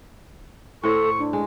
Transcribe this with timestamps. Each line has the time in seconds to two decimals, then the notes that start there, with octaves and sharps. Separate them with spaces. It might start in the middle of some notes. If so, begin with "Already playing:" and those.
0.84 A2 A4 C5 C#5 C#6
1.19 D4
1.33 G#3